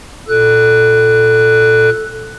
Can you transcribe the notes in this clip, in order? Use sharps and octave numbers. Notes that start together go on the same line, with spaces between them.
A#2 A4 F#6